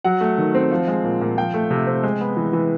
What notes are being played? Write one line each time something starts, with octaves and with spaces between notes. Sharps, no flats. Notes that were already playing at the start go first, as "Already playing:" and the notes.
F#3 F#5
A3
D#3
C4
F3
G#3
A#2
A#2
F3 G5
A3
C3
C4
G#3
B3
E3
E3